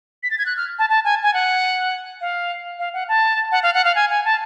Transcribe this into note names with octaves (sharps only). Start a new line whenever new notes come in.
B6
A6
G#6
F#6
F6
A5
A5
G#5
G#5
F#5
F5
F5
F#5
A5
F#5
F5
F#5
F5
G#5
G#5
A5